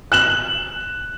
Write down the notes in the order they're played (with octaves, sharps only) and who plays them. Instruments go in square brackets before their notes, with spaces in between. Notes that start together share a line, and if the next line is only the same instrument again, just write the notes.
[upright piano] F#6 E7 F#7